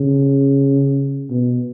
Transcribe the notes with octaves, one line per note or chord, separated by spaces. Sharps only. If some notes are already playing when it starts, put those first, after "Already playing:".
Already playing: C#3
B2